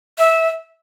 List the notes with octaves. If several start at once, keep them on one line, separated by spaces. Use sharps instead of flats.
E5